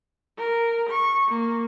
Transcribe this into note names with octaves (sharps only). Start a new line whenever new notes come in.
A#4
C#6
A#3